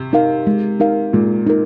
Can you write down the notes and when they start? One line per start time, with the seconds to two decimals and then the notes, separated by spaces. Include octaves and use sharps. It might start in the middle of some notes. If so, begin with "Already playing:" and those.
Already playing: C3
0.13 D#4 A#4 F5
0.47 G#3
0.80 D#4 A#4 F5
1.13 A#2 G#3
1.47 D#4 A#4